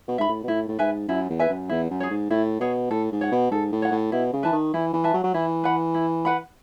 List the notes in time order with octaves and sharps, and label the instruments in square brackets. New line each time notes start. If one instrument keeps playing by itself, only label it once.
[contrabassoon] B2
[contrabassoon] G#2 [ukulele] E5 B5
[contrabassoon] A2
B2
[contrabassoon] A2 [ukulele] E4
[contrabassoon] A2
[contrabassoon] G#2 [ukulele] B4 E5 G#5
[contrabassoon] F#2 [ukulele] E4
[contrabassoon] E2
[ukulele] B4 E5 G#5
[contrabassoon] F#2
[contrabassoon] E2 [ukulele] E4
[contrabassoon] F#2
[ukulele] G#4 C#5
[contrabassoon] G#2
[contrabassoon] A2 [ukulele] E4
[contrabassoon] B2 [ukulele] G#4 C#5
[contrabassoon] A2 [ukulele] A4
[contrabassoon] G#2
[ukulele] C#5 F#5
[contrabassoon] B2
[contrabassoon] G#2 [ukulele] A4
[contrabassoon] A2
[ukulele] C#5 F#5
[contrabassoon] A2
[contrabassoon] B2 [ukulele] E4
[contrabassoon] C#3
[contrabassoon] E3 [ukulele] B4 E5 A5
[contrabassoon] D#3
[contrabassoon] E3 [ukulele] E4
[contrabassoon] E3
[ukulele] B4 E5 A5
[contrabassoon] F#3
F#3
[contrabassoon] E3 [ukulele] E4
[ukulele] B4 F#5 B5
E4
B4 F#5 B5